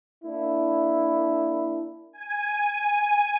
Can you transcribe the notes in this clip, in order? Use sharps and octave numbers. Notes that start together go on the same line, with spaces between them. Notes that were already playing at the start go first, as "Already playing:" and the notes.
A#3 D4 E4
G#5